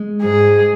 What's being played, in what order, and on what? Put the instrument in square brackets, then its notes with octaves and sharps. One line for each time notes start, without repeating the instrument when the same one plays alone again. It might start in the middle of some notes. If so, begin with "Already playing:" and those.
Already playing: [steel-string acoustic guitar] G#3
[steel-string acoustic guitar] G#2 [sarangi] G#4